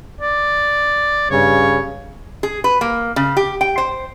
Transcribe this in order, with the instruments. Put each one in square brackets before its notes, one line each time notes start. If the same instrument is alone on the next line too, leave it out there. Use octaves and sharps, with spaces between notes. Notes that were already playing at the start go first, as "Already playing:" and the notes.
[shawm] D5
[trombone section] G2 C#3 [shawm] C#5
[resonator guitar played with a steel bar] G#4
B4
A#3
C#3
G4
G5
C5